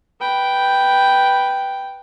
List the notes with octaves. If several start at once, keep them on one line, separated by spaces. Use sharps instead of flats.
B4 G5